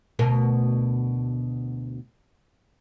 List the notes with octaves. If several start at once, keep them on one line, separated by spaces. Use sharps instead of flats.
D2 B2 A#4